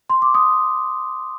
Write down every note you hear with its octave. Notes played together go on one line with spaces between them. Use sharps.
C6
D6
D#6